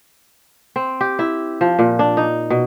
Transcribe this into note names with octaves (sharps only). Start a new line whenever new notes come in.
C4
G4
E4
F3
A#2
D4
D#4
B2